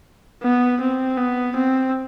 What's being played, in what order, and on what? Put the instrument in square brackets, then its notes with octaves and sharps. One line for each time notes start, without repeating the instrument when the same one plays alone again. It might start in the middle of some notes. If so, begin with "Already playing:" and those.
[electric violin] B3
C4
B3
C4